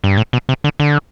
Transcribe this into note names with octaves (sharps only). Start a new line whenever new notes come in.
G2
A2
B2
C3
D3
D3